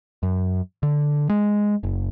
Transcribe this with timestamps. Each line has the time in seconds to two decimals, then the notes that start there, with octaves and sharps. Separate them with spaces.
0.23 F#2
0.83 D3
1.29 G#3
1.83 F#1